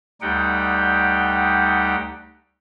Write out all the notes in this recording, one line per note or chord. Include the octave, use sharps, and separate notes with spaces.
D2 G3 D#4 G4 F#5 G5